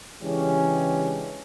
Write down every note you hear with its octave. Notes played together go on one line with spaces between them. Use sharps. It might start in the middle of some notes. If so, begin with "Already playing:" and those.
C#3 E3 G#3 C#4 D4 G4